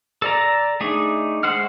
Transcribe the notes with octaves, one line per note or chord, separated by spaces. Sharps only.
A4 D5 A#5
A3 D4 D#4 G#4
G#3 A3 C5 F#5 F6